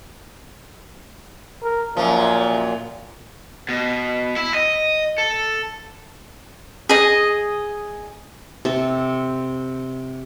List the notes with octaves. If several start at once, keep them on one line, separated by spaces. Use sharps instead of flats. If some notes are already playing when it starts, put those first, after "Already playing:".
A#4
F#2 A#2 F3
B2
E4
D#5
A4
G#4 D#5
C3 A4